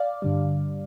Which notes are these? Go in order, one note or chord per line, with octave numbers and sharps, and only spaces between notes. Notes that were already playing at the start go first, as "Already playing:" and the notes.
Already playing: D5 F5
G2 D3 G3